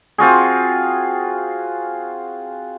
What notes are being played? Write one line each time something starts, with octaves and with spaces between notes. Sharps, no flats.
C4 F4 F#4 G#4